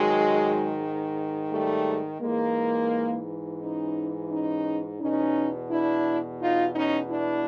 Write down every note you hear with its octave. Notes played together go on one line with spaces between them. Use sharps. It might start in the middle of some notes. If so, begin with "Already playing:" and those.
Already playing: G#2 D#3 F#3 G#3
G3 A3
G#2 E3 G#3 A#3
C#4 D#4
C#4 D#4
E2 B2 C#4 D#4
D4 E4
D#4 F4
C#4 D#4
D4 E4